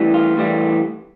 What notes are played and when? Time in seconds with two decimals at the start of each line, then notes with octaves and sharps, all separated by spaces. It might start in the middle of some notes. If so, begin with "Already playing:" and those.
Already playing: A2 E3 G3
0.14 F4
0.37 A2 E3 G3